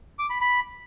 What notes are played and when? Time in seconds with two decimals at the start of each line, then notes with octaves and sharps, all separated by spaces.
0.19 D6
0.30 B5
0.41 B5